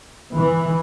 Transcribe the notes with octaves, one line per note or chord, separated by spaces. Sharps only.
E3